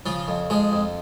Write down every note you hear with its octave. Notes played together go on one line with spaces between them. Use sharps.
C#3 F3 F4
F2
F3 G#3 G#4
F2